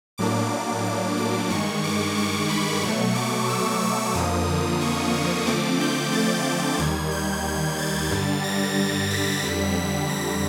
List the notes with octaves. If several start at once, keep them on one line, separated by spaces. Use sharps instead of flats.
A2 F#3 A#3 D4 D6
D6
D6
G2 D#3 G#3 C#6
D6
C#6
B5
B2 F#3 A3 C#6
D6
E6
E6
F2 D3 F3 A#3 D#6
C#6
C#6
D3 F3 A3 C4 D6
G6
A6
D#2 D#3 G3 G#6
G6
G#6
A6
G2 D3 G3
A#6
B6
F2 D3 G3 B6
A#6